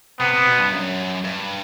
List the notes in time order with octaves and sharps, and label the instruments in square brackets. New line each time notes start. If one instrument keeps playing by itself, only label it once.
[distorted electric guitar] C3 [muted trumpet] B3
[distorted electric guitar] C3
B2
G2
F#2
G2